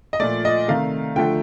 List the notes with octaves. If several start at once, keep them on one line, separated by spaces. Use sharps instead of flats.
D#5
A#2 F3 A3 D5
D#5
C3 D#3 A3 F5
D3 F3 A3 G5